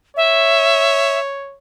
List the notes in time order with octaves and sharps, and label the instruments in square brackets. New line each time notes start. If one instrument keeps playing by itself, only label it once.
[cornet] C#5 [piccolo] E5